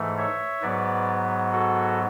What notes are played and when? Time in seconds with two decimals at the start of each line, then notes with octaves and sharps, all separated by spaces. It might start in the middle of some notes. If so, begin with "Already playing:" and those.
Already playing: G#2 E3 A3
0.18 C#5 E5
0.62 G#2 F#3 B3 B4 D5
1.52 F#4 A4